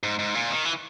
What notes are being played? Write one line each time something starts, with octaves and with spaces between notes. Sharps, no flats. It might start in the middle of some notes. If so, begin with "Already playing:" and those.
G#2
G#2
A#2
D#3
E3